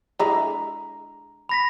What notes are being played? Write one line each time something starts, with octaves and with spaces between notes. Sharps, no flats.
D3 G#3 E4 A#5
B5 A#6 B6